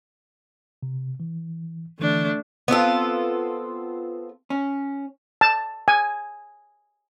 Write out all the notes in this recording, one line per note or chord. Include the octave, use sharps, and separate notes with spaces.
C3
E3
D3 E3 A3 D4
B3 C4 F4 A4
C#4
A5
G#5